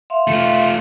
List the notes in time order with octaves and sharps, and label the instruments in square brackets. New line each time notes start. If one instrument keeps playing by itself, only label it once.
[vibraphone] E5 F5 C6
[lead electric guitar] A3 F4